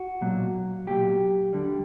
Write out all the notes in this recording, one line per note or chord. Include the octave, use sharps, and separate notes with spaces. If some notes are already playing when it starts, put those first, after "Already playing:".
Already playing: F#4
B1 A#2 F#3
B1 A#2 F#3 G4
D2 D3 G3